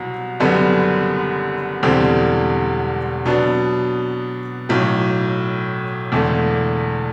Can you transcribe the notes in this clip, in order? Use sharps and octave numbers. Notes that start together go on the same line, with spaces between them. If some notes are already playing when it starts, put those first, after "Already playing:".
Already playing: C2 B2 F#3
F#1 F#2 D3 G3 B3
E1 E2 D3 G3 C4
B2 F#3 B3 D4
B1 A2 F#3
E1 E2 D3 A3